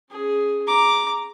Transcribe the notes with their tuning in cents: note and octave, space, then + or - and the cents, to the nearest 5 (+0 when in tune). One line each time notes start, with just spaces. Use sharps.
C#4 -5 G#4 +0
A#5 +0 D6 +0